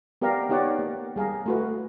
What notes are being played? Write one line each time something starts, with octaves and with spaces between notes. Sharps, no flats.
B3 G4 A#4 D5 F5 A#5
B3 D#4 G4 C#5 D5 F#5
A#3
G3 G#4 F5 A#5
A3 F#4 B4